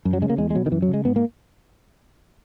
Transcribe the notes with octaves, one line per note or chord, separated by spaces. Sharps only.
F#2
F#3
C#3 G#3
A#3
E2 G#3
G#3
B2 F#3
D#3
F#2 E3
F#3
C#3
G#3
G#2 B3
A#3